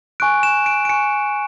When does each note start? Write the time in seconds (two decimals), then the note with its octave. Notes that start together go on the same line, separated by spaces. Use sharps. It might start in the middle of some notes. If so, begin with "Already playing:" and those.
0.20 G#5 C#6 F#6 D7
0.43 E7
0.66 D7
0.85 D7
0.89 G#5 C#6 F#6 C#7